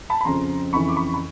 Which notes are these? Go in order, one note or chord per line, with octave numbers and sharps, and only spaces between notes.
A5 B5
B5
F2 C#3 F3 A#5 C6
F2 C#3 E3 B5 C#6
D6
B5 C#6
B5